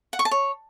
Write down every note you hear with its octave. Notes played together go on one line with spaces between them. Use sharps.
F#5
C#6
A5
C#5